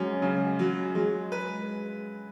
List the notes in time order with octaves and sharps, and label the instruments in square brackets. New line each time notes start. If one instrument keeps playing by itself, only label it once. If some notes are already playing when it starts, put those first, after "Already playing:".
Already playing: [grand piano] F#2 C#4 [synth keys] F#3 G#3
[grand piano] C#3
F#3
[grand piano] F#3 [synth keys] G#3
[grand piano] B4